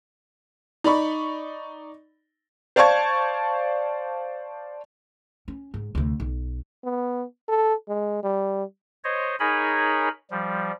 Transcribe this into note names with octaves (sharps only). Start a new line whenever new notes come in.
D#4 D5 B5 C#6
C5 D5 F5 A5 C#6 G#6
C#4
G#2
D2 C3
B1
B3
A4
G#3
G3
C5 C#5 D#5
D#4 G#4 A#4 C#5 G#5 B5
F3 G3